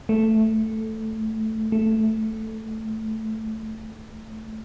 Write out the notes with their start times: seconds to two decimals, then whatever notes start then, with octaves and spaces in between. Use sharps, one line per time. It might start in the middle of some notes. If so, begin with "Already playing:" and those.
0.09 A3
1.72 A3